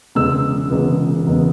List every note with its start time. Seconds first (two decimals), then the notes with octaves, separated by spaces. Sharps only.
0.15 E1 E2 C#3 G#3 B3 E6
0.70 E1 E2 C#3 G#3 B3
1.25 E1 E2 C#3 G#3 B3